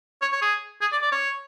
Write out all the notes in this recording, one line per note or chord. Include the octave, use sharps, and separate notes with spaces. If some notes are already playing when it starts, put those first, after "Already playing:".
C#5
C#5
G#4
G#4
D5
D5
C#5